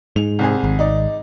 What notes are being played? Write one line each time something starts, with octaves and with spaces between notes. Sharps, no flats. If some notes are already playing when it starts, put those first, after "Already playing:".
G#2 F7
C2 C4 G#4
G#1
D#4 D5